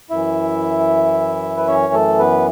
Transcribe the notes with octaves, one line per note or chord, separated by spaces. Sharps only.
F#2 E3 E4 E5
B4
C#4 C#5
A3 A4
B3 B4